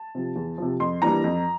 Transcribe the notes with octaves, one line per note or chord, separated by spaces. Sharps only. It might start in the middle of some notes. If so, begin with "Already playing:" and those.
Already playing: A5
C3 F3
E2
C3 F3
F2 C6
E3 G3 A#3 D4 A#5
F2